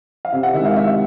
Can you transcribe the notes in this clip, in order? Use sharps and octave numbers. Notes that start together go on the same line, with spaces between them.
F5
C3 E5
F#5
D#3 G#3 E5
F5
C3 E5